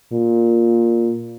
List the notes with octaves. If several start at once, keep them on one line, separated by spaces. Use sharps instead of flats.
A#2